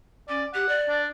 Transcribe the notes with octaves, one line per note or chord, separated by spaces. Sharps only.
C#4 D5
G4 F#5
D5
D4